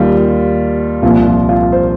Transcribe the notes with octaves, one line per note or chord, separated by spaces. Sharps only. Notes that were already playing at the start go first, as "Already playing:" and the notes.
Already playing: D#2 D#3 G3 F4
C2 A#2 F3 F4
F4
F4
C5